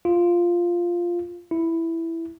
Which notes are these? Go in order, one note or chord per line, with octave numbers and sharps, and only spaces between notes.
F4
E4